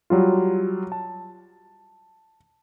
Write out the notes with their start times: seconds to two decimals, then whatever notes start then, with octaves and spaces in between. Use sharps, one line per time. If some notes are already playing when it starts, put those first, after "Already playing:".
0.10 F#3 G3 F4
0.92 A5